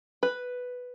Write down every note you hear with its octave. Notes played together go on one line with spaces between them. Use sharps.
B4